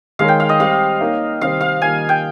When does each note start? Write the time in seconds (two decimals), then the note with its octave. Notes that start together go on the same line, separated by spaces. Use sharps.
0.19 D#3 G#3 D#4 A#4 C#5 F5
0.28 G5
0.40 F5
0.49 D#5
0.59 G3 C4 G4 F5
1.01 A#3 D#4 A#4 C#5
1.41 C3 D#3 G3 C4 F5
1.61 F5
1.82 D#3 G3 A#3 F4 G#5
2.09 G5